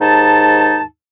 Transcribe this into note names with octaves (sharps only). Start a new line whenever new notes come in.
D#2 G#2 D#4 A5